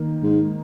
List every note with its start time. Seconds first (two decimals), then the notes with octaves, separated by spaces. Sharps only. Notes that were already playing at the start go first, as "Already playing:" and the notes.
Already playing: D#3 A#3 D#4
0.23 G#2